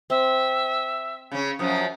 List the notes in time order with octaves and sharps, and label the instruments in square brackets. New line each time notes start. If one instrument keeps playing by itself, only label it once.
[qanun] C4 [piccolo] E5
[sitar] C#3 C#4
[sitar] F#2 F3 F#3 [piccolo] D#6